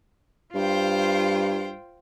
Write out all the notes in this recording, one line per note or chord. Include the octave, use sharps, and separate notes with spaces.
G2 F4 C5 G5